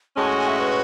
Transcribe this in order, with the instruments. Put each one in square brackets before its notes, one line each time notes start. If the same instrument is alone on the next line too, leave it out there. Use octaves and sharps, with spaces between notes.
[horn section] A2 G#3 C#4 F#4 [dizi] A5
[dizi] G#5
G#5
E5
B4